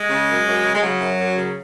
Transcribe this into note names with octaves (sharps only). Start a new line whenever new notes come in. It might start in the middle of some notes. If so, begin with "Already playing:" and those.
Already playing: G#3
C#3
F#2
F#2
C#3
G#3
C#3 F#3
F#2
F#2
C#3